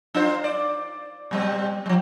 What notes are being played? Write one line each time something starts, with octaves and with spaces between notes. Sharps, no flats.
D4 F4 C5
D5
A#2 G3 C4
F3 G3